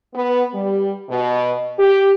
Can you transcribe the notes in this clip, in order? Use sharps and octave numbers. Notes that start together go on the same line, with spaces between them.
B3
G3
B2
G4